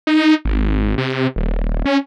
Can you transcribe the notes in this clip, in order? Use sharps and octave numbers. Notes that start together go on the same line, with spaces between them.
D#4
G#1
C3
D#1
C#4